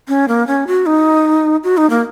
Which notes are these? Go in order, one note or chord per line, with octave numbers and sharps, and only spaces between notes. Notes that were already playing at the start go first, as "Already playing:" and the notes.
C#4
A#3
C#4
F#4
D#4
F#4
D#4
A#3